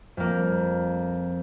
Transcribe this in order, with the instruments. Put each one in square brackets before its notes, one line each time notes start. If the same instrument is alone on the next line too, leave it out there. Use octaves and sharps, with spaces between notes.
[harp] F2 A#3